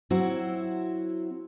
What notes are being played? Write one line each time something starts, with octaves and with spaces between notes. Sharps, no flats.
F#3 C4 E4 F#4